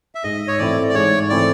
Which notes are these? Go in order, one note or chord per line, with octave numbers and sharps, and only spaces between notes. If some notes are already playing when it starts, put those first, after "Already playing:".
E5
G#2 D#5
C#5
E3 A3 C4 E4 D5
D5
G#2 C#5
E3 A3 C4 E4 D5